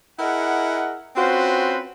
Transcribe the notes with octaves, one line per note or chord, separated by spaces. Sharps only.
E4 G#4 A#4 D#5 F#5
C4 C#4 F4 F#4 B4 C5